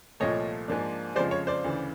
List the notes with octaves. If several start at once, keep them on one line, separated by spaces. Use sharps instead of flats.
C2 A#2 F3 A3 C#5 D#5
G#2 F3 A#3 D4
F2 C#3 F3 G#3 C5 D5
C#5
C5 D5
D2 C#3 E3